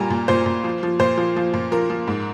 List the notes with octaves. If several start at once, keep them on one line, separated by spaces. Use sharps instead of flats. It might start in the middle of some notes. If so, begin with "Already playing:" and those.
Already playing: A#2 G3 G#5 A#5
A#2
A#2 C5
A#2
F3
F3
A#2 C5
F3
F3
A#2
F3 A#4
F3
G#2